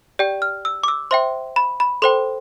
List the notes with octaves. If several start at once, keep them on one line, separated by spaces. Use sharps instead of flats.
G4 D5 G5
F6
E6
D6
E6
C5 E5 G5 C6
B5
B5
A4 C5 G5 C6